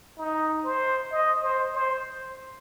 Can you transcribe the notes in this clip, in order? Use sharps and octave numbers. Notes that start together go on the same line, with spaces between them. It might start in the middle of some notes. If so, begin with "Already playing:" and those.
D#4
C5
D#5
C5
C5